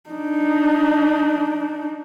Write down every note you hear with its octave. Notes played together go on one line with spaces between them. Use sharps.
D4 D#4